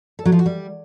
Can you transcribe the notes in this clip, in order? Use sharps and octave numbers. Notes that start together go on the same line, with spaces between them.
A4
F#3
F3
F#4
G3